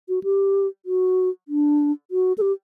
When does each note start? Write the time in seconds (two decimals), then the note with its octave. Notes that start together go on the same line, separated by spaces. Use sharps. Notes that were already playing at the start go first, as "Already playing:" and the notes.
0.09 F#4
0.23 G4
0.86 F#4
1.48 D4
2.11 F#4
2.38 A4
2.41 G4